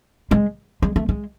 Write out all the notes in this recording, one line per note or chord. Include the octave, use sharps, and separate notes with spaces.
G#3
G#3
A3
G#3